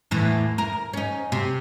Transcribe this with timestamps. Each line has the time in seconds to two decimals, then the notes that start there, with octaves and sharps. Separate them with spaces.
0.11 E2 A2 E3
0.58 A#4
0.94 C#4 D#4
1.32 C3